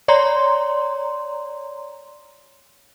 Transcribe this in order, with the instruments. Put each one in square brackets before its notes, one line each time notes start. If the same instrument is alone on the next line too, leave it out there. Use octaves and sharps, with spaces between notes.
[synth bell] C#5 D5 A#5 C6